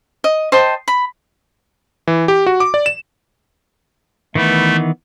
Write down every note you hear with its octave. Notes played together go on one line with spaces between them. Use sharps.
D#5
C5 D#5 G5 A5
B5
E3
G4
F#4
D6
D5
E7
D#3 E3 A3 B3